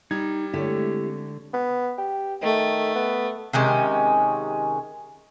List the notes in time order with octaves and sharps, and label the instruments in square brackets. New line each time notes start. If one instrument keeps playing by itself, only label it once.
[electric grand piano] G3 G#6 [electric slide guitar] D#4
[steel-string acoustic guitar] D3 C#5 [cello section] G#3 A3 C4 [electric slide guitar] E4 G4 A4
[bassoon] B3
G4
[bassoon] D#3 [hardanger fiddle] A3
[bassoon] B3
[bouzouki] C3 D#3 G#3 C#4